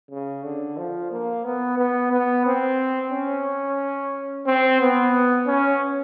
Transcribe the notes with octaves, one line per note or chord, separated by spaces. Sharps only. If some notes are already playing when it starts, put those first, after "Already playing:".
C#3
D3
F3
A#3
B3
B3
B3
C4
C#4
C4
B3
C#4